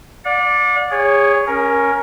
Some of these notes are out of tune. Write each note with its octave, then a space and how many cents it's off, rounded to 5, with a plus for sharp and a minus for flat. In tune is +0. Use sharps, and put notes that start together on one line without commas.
D5 +0 F#5 -45
G#4 -25 C#5 +5
C#4 +0 A#4 +15